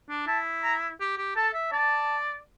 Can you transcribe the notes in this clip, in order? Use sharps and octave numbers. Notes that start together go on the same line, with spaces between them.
D4
E4 A5
A#5
G4
G4
A4 A5
E5
D5 A5